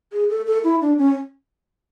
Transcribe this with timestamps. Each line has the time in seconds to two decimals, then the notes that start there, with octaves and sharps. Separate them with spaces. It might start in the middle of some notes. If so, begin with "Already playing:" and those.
0.12 G#4
0.30 A4
0.47 A4
0.64 E4
0.81 D4
0.98 C#4